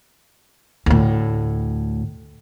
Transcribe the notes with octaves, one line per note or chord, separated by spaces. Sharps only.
D2 A2